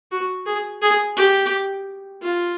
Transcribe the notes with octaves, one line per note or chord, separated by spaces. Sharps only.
F#4
G#4
G#4
G4
F4